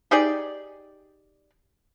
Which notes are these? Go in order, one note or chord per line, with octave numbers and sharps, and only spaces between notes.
D#4 G4 G#4 D5